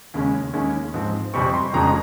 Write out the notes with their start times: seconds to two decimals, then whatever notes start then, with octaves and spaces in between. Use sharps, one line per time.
0.14 D#2 C#3 G#3 C#4
0.53 D#2 D#3 G#3 C#4
0.94 G#2 F3 C4
1.34 F2 C3 G3 C4 C#6
1.54 C6
1.74 F1 F2 C#3 F3 G#3 A#5